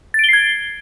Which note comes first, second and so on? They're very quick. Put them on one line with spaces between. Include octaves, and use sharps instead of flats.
A6 D7 G7 C7 G#6